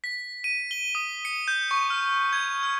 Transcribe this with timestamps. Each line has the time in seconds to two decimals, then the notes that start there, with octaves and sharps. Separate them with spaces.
0.04 B6
0.44 D#7
0.71 G7
0.95 D#6
1.25 C#7
1.48 G6
1.71 C#6
1.90 F6
2.33 G#6
2.63 F6